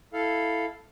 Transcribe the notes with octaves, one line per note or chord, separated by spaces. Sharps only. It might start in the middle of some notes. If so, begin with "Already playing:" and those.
E4 A4 F5